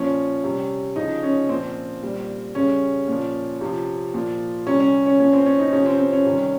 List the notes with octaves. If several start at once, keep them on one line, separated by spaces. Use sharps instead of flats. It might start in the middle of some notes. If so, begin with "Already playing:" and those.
Already playing: A#2 F3 C#4
C3 G3
C#3 F3 D#4
C#4
A#2 F3 C4
A#2 G3
C#3 G3 C#4
A#2 F3
C3 F3
A#2 F3
C3 G3 C#4
C#4
C#4
A#2 F3 C#4
C4
C#4
D#4
C3 F3 C#4
C4
C4
C#4
C3 D#3 G3